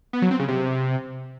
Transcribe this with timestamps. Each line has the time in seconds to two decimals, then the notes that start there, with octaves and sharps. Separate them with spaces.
0.13 B3
0.22 F#3
0.31 C4
0.39 C#3
0.48 C3